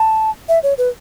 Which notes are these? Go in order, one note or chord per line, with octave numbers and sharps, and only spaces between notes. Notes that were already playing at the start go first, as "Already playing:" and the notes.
Already playing: A5
E5
C#5
B4